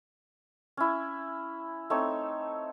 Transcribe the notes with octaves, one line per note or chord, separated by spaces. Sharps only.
C#4 E4
A3 C4 D#4 C#5